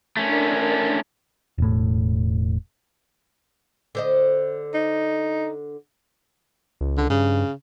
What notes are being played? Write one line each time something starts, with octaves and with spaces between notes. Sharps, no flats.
A3 C#4 D4 A#4
E1 A2
D3 C5 D#5
D#4
C#2
D3
G2 C#3